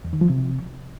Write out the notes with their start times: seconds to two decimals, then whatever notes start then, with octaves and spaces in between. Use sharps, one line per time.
0.05 E2
0.13 D#3
0.21 F3
0.30 C3